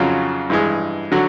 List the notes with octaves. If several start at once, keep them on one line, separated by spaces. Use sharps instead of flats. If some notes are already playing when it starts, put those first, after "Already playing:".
Already playing: F2 C#3 F#3 F4
G2 E3 G#3
D3 F#3 F#4